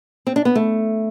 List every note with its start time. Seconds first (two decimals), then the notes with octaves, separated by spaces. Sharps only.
0.27 C4
0.36 D4
0.45 B3
0.55 A3